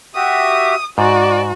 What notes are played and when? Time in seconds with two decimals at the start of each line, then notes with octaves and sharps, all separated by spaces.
0.15 F#4 G4 E5 D#6
0.98 G#2 F#4 D5